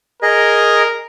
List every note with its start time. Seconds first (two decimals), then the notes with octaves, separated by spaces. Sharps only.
0.22 G#4 A#4 D#5